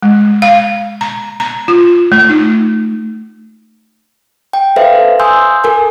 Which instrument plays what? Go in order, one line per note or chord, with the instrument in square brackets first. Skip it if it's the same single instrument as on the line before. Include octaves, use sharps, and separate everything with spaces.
[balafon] G#3
F5
A#5
A#5
F4
A3
D#4
[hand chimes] G5
A4 B4 C5 E5 F5
G#5 C6 D#6 E6 G6
A4 A#4 G#5